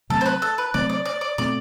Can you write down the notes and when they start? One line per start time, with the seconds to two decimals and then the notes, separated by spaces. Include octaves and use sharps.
0.10 C3 F#3 A3 C4 A4
0.21 C5
0.26 B4
0.42 A4
0.58 B4
0.74 C3 F#3 A3 C4 D5
0.90 D5
1.05 D5
1.21 D5
1.38 B2 A3 C4 D5